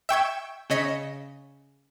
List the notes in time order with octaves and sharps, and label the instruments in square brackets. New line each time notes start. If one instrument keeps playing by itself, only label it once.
[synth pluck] E5 G5 C#6 G#6
C#3 C#4 D#5 B6 C#7